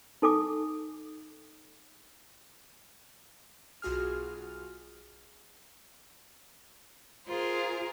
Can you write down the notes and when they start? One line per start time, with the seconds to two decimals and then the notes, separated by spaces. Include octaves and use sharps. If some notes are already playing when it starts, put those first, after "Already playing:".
0.22 D#4 A4 G#5 D6
3.82 B1 F4 F#4 G#4 F6
7.28 F4 G#4 A#4 C5